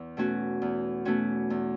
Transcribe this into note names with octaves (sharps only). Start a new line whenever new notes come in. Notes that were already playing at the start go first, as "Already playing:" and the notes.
Already playing: E2
B2 A3 C#4 F#4
E2
B2 A3 C#4 F#4
E2